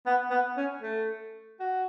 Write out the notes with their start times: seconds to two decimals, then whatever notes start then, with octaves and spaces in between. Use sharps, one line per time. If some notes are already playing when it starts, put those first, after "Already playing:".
0.06 B3
0.31 B3
0.57 C#4
0.82 A3
1.60 F#4